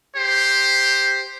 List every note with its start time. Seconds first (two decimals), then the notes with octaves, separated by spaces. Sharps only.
0.16 G4 C5